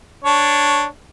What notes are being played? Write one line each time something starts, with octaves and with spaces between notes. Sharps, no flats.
D4 C#5